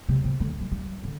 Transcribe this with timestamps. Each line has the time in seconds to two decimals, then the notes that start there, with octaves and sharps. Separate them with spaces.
0.09 C3
0.24 C3
0.40 D3
0.61 G3
0.72 G3
1.04 D3